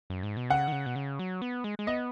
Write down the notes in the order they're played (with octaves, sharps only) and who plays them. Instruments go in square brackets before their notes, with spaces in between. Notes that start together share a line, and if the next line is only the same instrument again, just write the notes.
[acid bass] F#2
G#2
B2
[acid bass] C#3 [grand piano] F#5
[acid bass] D#3
C#3
B2
C#3
F#3
B3
G#3
G#3
[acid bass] B3 [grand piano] D#5